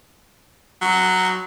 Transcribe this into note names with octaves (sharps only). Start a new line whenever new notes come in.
F#3